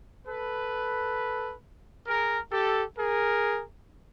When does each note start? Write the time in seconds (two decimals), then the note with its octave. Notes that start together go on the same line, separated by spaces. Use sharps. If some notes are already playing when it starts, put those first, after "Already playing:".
0.27 A4 B4
2.07 G#4 A#4
2.52 G4 A4
2.98 G#4 A#4